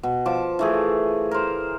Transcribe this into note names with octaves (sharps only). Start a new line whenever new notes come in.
B2
F3 A5 D6
E3 A3 G#4
A#4 C5